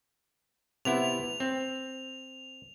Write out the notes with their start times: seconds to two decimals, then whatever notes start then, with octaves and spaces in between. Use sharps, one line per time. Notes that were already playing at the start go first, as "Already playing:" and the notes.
0.85 C3 B3 E4 F7
1.40 C4